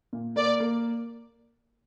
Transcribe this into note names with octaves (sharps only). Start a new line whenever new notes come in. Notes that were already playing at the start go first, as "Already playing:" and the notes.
A#2
A#3 D5
A#3